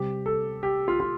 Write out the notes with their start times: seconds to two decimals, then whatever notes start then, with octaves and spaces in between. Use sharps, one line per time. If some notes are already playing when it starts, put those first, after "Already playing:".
Already playing: C3 G3 G4
0.26 A4
0.63 G4
0.88 F4
1.00 F4